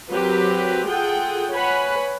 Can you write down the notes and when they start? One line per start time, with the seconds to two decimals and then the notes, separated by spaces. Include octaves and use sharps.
0.11 F#3 C4 G4 A#4 B4
0.88 F4 G#4 A4 F#5 G5
1.52 B4 C#5 F#5 G#5 B5